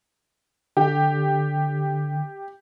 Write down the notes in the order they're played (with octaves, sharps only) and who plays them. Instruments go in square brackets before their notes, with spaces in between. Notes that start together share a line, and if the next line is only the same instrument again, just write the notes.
[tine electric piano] D3 [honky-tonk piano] G4